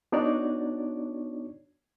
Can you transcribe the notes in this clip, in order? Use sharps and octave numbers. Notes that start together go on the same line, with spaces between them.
B3 D4 D#4 F#4 C#5 D5